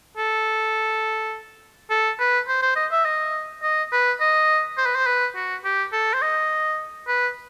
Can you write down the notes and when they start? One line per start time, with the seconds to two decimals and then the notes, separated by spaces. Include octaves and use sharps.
0.17 A4
1.90 A4
2.20 B4
2.48 C5
2.62 C5
2.76 D#5
2.92 E5
3.05 D#5
3.63 D#5
3.92 B4
4.21 D#5
4.78 C5
4.86 B4
4.95 C5
5.06 B4
5.36 F#4
5.65 G4
5.93 A4
6.14 C5
6.22 D#5
7.08 B4